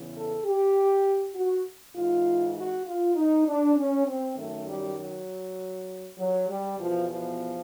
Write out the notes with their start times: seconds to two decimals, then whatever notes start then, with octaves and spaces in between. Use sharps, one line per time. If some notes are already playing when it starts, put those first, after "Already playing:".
Already playing: E2 C#3 E3
0.15 A4
0.45 G4
1.35 F#4
1.96 G#2 E3 F4
2.56 F#4
2.86 F4
3.16 D#4
3.46 D4
3.76 C#4
4.07 C4
4.36 F#2 D#3 A3
4.67 G3
4.98 F#3
6.18 F#3
6.48 G3
6.78 E2 B2 F3
7.08 F3